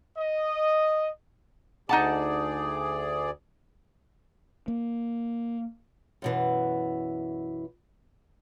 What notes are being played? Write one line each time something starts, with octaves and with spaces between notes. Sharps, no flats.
D#5
D2 D#4 G#4 D5 F#5 A5
A#3
F#2 B2 E3